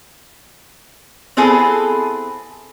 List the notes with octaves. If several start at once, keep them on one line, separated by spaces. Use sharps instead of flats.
B3 C4 E4 G#4 A4